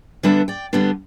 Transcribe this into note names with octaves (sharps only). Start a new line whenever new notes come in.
D3 G3 B3 D4 B4 E5
D5 G5
D3 G3 B3 D4